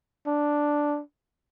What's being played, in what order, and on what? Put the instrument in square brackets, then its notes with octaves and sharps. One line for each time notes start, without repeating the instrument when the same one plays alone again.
[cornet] D4